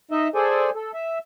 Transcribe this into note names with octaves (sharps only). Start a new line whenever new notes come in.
D#4 D#5 E5
G#4 A4 C5 D5 G#5
A4
E5